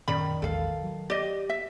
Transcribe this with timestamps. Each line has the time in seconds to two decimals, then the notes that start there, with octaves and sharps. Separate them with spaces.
0.08 F#2 A#2 D#3 C#4 D5 B5
0.42 A#1 E2 G#3 A4 F5
0.83 F#3
1.10 G4 D5 D#5
1.49 E5